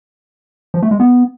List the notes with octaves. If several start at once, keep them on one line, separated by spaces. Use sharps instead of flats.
F3
A3
G#3
B3